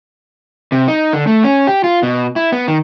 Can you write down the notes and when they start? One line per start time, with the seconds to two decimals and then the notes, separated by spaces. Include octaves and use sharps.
0.72 C3
0.88 D#4
1.13 D3
1.27 A3
1.44 C#4
1.67 G4
1.84 F4
2.03 B2
2.36 E4
2.52 B3
2.68 D#3